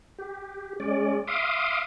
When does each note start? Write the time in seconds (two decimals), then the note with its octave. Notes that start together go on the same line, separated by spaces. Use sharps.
0.19 G4
0.80 G#3 C#4 D5
1.28 E5 F5 C6 D6 D#6